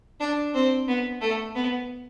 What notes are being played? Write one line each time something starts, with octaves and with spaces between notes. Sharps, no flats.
D4
C4
B3
A3
B3